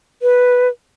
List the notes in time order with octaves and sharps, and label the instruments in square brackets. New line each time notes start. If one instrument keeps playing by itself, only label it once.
[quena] B4